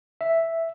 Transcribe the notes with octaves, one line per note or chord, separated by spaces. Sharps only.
E5